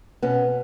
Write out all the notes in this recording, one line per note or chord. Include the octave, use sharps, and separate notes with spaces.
B2 B3 C#4